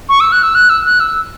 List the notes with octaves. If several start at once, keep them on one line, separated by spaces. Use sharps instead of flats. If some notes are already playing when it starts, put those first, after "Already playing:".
C#6
E6
F#6
E6
F#6
E6
F#6
E6